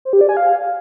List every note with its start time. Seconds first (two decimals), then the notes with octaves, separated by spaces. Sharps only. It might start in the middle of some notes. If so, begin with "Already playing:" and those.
0.05 C5
0.13 G4
0.21 D5
0.29 G#5
0.37 F5